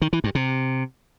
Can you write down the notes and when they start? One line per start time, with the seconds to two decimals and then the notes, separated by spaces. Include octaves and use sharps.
0.02 D#3
0.13 E3
0.24 G2
0.35 C3